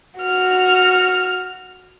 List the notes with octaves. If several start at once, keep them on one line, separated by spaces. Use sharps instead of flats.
F#4 F6